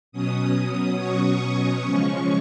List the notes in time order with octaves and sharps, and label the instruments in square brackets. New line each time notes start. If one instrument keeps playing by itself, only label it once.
[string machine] B2 F#3 C#4 D#6
C#6
C#3 F3 G#3 C#4